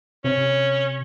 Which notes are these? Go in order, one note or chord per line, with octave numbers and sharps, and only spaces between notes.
C3 C#4